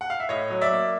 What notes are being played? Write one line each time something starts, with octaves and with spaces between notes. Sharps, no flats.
F#5
F5
E5
A2 C#5 D#5
F#3
D5 E5
A#3